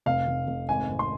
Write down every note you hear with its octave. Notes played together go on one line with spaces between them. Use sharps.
F1 F5
F1
F1
G#1 G#5
G#1
C6